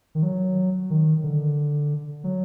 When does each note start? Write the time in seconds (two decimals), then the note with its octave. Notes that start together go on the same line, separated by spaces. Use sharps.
0.15 D#3
0.23 F#3
0.90 D#3
1.23 D3
2.24 F#3